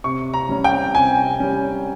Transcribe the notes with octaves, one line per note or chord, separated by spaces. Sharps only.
C3 C#6
A#5
G3 C#4
G5
C3 G#5
G3 C#4